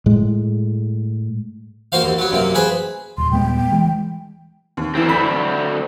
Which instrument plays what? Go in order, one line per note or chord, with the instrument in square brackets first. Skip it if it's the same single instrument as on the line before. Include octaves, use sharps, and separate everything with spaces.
[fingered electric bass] A2 G#3
[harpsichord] A#3 F#4 C5 F5
D#2
F#3 B3
F#2 C3 A#3
G#4 B4 C5
[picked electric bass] D#1 [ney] C6
[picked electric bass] D#1 G#3 B3 [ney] G5
[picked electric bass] E3 G#3
[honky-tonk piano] D#2
[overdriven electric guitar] D2 C4 [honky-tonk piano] E3 E4
[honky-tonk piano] B5 B6